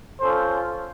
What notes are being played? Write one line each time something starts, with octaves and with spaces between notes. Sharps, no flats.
C#4 F4 A4 C5